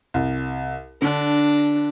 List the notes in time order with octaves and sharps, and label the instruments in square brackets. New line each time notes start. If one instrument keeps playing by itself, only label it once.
[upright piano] C2
[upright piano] D3 [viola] D4